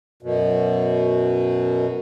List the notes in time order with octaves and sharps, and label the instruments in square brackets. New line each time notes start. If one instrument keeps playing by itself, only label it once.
[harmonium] F#2 B2